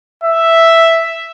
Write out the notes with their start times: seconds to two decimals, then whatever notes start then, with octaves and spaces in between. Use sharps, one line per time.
0.24 E5